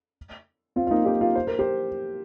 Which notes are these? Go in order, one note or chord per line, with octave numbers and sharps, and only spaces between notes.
C4 F4
F4
A#3 D#4
D#4 G4
F4 A#4
C5
A#4
G4 C5